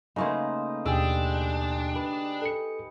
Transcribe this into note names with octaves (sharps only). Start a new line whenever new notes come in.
C#3 A3 A#3 D#4 B4 C5
D#2 B2 D4 G4 G#4 E6
B4
A4 C#7